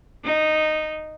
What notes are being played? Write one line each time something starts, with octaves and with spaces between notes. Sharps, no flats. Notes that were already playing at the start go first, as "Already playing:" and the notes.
D#4